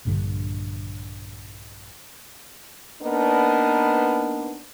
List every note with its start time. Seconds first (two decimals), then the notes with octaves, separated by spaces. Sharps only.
0.05 A#1 G2 D3
3.02 A#3 B3 D4 D#4 A#4 B4